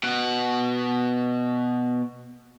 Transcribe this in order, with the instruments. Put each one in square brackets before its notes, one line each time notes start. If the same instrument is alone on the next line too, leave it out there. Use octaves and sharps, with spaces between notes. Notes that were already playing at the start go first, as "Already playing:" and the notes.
[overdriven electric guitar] B2 F#5